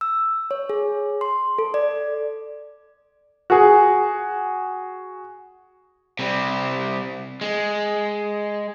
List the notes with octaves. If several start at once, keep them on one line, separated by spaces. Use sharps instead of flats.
E6
C#5
G#4
C6
A4
D5
F#4 G#4
C3 G3
G#3